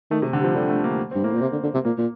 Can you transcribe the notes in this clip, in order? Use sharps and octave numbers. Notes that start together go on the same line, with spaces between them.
D#3 A3
C3
D3
G3
F3
D3 G3
A3
A#3
G2 C4
A2 A#3
A#2 C4
C3
D3
D3
C3
A#2 A#3
A#2